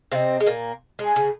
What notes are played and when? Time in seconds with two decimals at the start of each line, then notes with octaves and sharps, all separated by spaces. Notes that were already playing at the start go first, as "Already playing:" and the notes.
0.12 C3 C4 D#5 F5
0.40 G#3
0.46 A#2 A#3
0.99 G#3
1.05 G#5
1.16 C#3